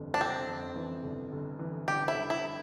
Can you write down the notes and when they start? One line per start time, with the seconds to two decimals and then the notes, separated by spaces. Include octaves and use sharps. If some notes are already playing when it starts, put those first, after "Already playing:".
Already playing: G1 F2 E3
0.14 D4
0.20 G1 C4
0.49 F2
0.76 E3
1.04 G1
1.32 G1
1.59 E3
1.87 G1 G4
2.08 E4
2.15 G1
2.30 E4